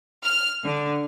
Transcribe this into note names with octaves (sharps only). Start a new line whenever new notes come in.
F6
D3